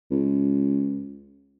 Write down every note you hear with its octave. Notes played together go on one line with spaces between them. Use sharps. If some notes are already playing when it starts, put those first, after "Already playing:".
C#2